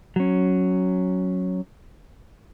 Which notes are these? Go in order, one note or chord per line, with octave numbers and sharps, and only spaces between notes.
F#3 C#4